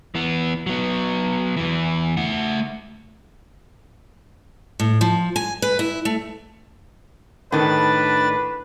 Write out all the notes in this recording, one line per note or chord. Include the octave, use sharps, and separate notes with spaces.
E3 B3
F#3 B3
E2 E3
A3 F#5
A2
F3
G#5
B4
E4
A3
A2 D#3 D4 B4 A6